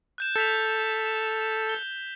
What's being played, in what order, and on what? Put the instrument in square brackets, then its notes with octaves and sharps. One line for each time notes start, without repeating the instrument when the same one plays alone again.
[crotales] F#6 G6 E7
[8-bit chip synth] A4 [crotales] G6 B6 F7
[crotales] G7